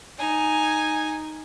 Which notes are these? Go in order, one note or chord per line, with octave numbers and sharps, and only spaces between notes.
D#4 G#5